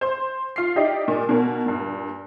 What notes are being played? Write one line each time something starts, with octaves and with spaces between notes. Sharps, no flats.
C5 C6
F4 C7
D#4 E4 G4 D5 D#5
A#2
B2 A#3
G2 A#2